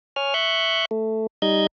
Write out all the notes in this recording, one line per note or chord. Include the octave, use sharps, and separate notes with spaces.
C#5 G#5 F6
E5 C#6 F#6 G6
A3
G3 D#4 D#5 G6 G#6